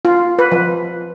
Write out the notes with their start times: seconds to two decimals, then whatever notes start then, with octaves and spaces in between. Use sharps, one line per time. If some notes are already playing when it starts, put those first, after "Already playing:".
0.05 F4
0.39 B4
0.52 F3